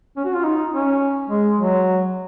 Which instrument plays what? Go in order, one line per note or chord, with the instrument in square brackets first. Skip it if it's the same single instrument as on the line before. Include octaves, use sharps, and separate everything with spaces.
[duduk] C#4
F#4
F4
D#4
C#4
G#3
F#3